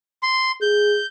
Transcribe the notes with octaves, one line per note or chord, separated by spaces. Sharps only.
C6
G#4 G6